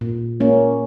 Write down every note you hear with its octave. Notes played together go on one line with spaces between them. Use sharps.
A#2
A#3 C#4